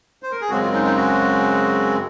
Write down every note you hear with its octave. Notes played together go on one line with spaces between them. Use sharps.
C5
A#4
G#4
F#2 C#3 G#3 C4 F#4
F4
D#4
D#4
F#4